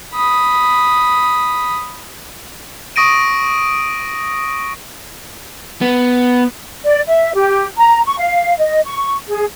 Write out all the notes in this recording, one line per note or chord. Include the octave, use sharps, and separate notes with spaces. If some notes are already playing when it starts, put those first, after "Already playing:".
B5 D#6
C#6 D#6 A#6 D7 D#7
B3
D5
E5
G4
A#5
C#6
F5
D#5
C#6
G#4